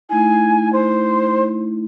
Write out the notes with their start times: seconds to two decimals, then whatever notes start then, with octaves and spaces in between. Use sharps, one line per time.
0.09 A3 D#4 E4 G#5
0.72 C5